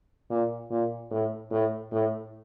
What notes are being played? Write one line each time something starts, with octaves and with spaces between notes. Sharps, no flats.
A#2
A#2
A2
A2
A2